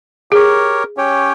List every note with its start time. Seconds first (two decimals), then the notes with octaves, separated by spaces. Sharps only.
0.31 G4 G#4 A#4 C#5
0.97 C#4 G4 C#5 G5